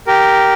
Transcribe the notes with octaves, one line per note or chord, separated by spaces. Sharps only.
G4 A#4